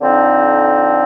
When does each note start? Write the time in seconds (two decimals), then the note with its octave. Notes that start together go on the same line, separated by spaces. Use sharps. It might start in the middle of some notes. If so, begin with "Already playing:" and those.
0.01 F2 D3 F3 C4 D#4